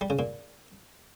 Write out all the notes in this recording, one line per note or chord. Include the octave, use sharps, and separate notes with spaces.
G3
C#3
A#2